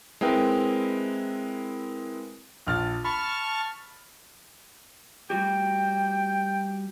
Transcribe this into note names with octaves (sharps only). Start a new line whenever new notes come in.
G#3 C4 E4 A#4 B4 G5
A#1 F6 A6
A5 B5 C#6 F6
G3 F#4 G4 G5